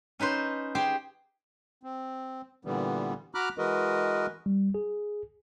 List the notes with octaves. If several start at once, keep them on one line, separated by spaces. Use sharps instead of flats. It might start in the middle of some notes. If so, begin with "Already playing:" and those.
C#4 D#4 B4 C5
G4 G#4 C5 G5
C4
A#2 D3 E3 G3 B3
F#4 A#5 B5 D6 F6 F#6
E3 G#3 F#4 A#4 B4 D#5
G3
G#4